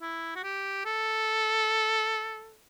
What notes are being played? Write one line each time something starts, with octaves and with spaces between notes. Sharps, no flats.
E4
F#4
G4
A4